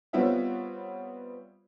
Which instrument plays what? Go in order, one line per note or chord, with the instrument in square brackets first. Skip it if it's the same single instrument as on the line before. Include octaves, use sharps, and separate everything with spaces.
[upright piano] G3 B3 C4 F4 C#5 E5